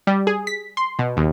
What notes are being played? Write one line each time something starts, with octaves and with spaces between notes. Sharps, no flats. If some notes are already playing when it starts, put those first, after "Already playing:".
G3
G#4
B6
C6
B2
D#2